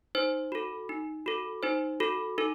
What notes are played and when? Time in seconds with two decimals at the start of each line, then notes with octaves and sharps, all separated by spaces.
0.15 D#4 C5
0.52 F#4 A4
0.89 D#4
1.26 F#4 A4
1.63 D#4 C5
2.00 F#4 A4
2.38 D#4 A4